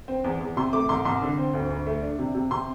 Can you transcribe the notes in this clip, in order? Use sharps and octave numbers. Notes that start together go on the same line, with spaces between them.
C4
E2
E2
C3 C6
A3 D6
C2 C6
C2 C6
D3
C4
D2
D2
A3
D4
C3
C3
C3 C6